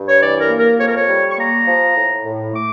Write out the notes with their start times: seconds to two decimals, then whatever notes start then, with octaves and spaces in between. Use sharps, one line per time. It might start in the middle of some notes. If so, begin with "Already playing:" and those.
Already playing: G2
0.09 C#5
0.20 E3 D5
0.39 A#4
0.49 A#3
0.59 A#4
0.78 F2 C#5
0.87 A#4
0.96 C#5
1.07 G3
1.31 C#6
1.36 A#3 A#5
1.66 F3
1.95 A2
2.24 A2
2.53 A3 D6